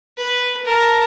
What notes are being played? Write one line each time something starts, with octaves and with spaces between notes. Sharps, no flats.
B4
A#4 A5